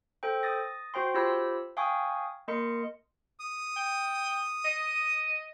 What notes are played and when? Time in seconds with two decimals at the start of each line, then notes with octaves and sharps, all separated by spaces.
0.23 A4 C5 G5
0.43 D#6 A6 A#6
0.94 F#4 C5 G5 C6
1.14 F4 G4 C5 B5 E6
1.77 F5 G5 G#5 C#6 D#6
2.48 A#3 A#4 D#5 C6 C#7
3.39 D#6
3.76 G5
4.64 D#5